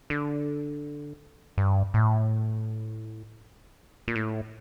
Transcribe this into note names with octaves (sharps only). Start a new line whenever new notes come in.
D3
G2
A2
A#2
A2